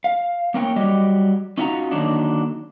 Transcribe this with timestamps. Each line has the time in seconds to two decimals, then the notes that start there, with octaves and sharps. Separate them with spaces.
0.04 F5
0.54 A#3 C#4 A#4 C#5 G5
0.76 F#3 G3 G4 D5 D#5
1.58 C#4 D#4 F4 F#4 F5 A#5
1.91 D3 D#3 F#3 A#3 D4 D#4